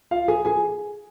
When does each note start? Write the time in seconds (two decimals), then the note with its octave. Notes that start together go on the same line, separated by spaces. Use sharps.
0.11 F4 F5
0.28 G#4 G#5
0.45 G#4 G#5